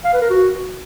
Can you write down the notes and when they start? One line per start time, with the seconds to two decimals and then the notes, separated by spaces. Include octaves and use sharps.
0.05 F5
0.13 B4
0.22 A#4
0.30 F#4